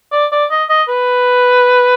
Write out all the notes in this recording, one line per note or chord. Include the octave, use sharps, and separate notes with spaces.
D5
D5
D#5
D#5
B4